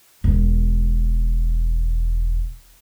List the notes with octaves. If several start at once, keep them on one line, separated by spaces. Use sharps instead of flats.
E1 F4